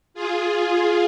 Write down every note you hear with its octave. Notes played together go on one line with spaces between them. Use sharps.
F4 G#4